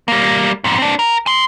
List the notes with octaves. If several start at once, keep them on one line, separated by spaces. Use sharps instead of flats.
G3 A#3
F2 G#2
C4 D4
A#4
G#5 C6